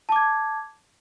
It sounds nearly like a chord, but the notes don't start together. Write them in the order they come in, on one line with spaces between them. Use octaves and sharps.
A5 D6 G#6